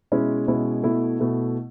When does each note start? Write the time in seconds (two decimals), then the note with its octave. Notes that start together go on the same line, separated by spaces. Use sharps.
0.12 B2 G#3 C#4 E4
0.48 B2 G#3 C#4 E4
0.84 B2 A3 E4
1.20 B2 A3 E4